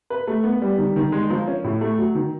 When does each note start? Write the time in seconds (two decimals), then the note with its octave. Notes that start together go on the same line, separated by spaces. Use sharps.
0.10 B4
0.27 A3
0.44 B3
0.62 G3
0.78 D#3
0.96 D#3
1.12 G#3
1.30 F3
1.48 C#4
1.64 A2
1.81 A3
1.98 F#3
2.15 D#3